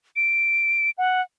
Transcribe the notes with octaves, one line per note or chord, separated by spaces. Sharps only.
D7
F#5